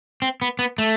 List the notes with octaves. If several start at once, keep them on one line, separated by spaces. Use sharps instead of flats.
C4
B3
B3
A3